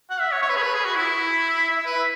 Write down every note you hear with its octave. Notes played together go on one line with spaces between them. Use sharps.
F#5
E5
C#5
C#5
B4
G#4
B4
G#4
F#4
E4
E5
B4